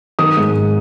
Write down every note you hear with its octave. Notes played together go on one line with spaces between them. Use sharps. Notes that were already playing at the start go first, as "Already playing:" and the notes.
D#3 D#6
G#2